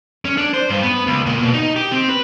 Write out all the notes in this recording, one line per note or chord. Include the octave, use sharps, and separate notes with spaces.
C#4
D4
C5
G2
B3
C#2
A#2
B2
D#4
G4
C4
B4